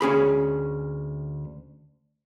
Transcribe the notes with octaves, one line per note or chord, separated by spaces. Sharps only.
D2 C#4 G#4 B5